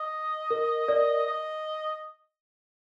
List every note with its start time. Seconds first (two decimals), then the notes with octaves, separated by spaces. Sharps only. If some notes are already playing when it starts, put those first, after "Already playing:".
Already playing: D#5
0.51 A#4
0.88 A#4 D5
1.27 D#5